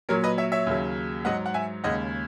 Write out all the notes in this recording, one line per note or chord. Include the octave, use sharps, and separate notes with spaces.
A#2 F#3 A#4 C#5
B4 D#5
C#5 E5
C#5 E5
D#2 C#3 F#3
G#2 F#3 D#5 F#5
F#5
E5 G#5
D#2 C#3 G#3 D#5 F#5